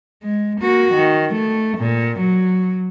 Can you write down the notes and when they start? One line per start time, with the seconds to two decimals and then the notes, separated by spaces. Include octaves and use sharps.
0.23 G#3
0.60 A#3 F#4
0.94 D#3
1.34 A3
1.78 A#2
2.20 F#3